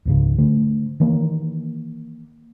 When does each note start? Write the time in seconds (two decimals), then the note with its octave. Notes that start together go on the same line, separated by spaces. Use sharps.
0.05 C#2 G#2 C#3
0.38 D3 A3
1.00 D#3 E3 A#3